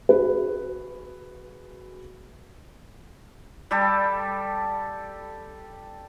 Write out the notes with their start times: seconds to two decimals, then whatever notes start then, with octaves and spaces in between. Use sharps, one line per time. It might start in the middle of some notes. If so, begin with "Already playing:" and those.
0.09 F#4 G#4 B4
3.71 G3 G4 A4